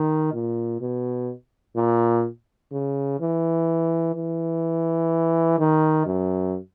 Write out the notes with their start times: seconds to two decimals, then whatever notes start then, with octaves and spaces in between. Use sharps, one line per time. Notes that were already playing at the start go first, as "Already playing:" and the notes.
Already playing: D#3
0.33 A#2
0.81 B2
1.76 A#2
2.72 C#3
3.20 E3
4.15 E3
5.59 D#3
6.06 F#2